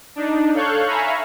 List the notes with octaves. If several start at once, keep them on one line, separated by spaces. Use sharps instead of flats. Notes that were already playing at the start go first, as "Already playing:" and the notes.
D4 D#4
A4 C#5 F5 C#6 F#6 G6
E5 F5 G#5 A#5 B5 C#6